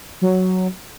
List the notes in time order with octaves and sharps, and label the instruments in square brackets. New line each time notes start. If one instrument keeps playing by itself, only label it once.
[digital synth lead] F#3